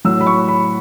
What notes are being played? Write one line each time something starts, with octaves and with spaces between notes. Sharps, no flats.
A2 F#3 E6
B5
C#6
B5